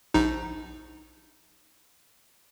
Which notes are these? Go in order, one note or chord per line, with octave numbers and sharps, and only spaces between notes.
A#1 D#4